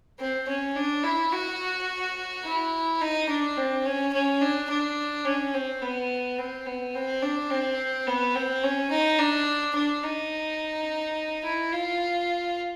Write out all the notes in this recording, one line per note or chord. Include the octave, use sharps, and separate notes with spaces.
C4
C#4
D4
E4
F#4
E4
D#4
D4
C4
C#4
C#4
D4
D4
C#4
C4
B3
C4
B3
C4
D4
C4
B3
C4
C#4
D#4
D4
D4
D#4
E4
F4